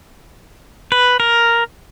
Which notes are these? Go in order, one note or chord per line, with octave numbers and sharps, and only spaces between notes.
B4
A#4